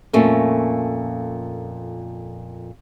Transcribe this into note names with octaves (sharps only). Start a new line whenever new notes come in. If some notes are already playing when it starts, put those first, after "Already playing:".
F2 A#2 A3 A#3 C#4